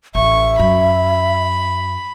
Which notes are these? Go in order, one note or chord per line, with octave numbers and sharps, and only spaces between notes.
A1 E5 C#6
F#2 B5